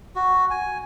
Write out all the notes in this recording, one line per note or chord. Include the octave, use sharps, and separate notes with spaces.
F#4
G#5